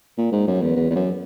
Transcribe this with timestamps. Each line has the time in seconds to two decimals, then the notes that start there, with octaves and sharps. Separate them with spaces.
0.17 A#2
0.32 G#2
0.47 F#2
0.61 E2
0.76 E2
0.90 E2
0.96 F#2